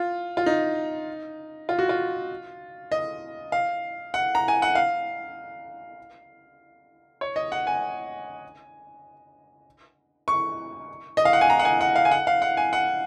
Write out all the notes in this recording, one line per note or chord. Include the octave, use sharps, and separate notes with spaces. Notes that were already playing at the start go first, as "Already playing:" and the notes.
Already playing: F4
F4
D#4
F4
F#4
F4
D#5
F5
F#5
A#5
G#5
F#5
F5
C#5
D#5
F#5
G#5
C#6
D#5
F5
F#5
G#5
A#5
F#5
G#5
F#5
F5
G#5
F#5
F5
F#5
G#5
F#5